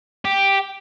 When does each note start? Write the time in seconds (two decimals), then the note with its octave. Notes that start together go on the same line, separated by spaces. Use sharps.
0.25 G4